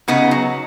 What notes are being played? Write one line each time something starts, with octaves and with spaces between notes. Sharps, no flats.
C#3 B3 D#4
F#3